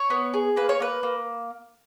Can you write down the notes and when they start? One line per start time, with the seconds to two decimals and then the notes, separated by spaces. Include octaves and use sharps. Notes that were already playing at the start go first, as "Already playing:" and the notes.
Already playing: C#5
0.10 B3
0.34 G#4
0.56 A#3 B4
0.69 C#5
0.80 A#3 B4
1.03 A#3